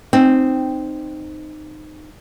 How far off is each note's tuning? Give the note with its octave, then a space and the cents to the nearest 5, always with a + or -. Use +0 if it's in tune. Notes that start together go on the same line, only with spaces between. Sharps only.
C4 -5 D#4 -20